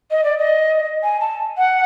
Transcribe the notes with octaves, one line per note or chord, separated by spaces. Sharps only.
D#5
D5
D#5
G#5
A5
F#5